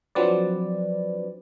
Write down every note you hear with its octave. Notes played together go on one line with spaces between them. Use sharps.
F3 F#3 C4 D4 B4 D5